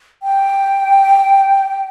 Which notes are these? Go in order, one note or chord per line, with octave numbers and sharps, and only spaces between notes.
G5